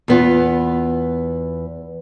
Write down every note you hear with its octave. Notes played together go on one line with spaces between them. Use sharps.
E2 B3 F4